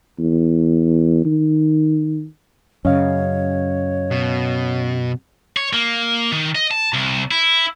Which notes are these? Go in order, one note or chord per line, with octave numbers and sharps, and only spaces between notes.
E2
D#3
F#2 C#3 C#4 C#5 D#5 F5
B2
C#5
A#3
D#3
D#5
A5
C2
E4